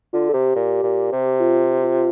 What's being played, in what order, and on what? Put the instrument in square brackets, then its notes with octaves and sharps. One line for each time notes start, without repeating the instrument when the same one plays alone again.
[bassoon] D3 [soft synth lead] F4
[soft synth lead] A4
[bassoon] C3 [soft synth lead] G4
[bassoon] A#2
A#2
C3
[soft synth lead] F4
F4